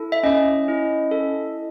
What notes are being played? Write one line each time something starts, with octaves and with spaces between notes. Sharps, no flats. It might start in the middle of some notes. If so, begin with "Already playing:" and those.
Already playing: E4 A4
E5
C#4 D#5
E4
A4